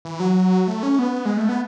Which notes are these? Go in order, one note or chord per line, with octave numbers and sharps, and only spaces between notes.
E3
F#3
A3
C#4
B3
G#3
A3
B3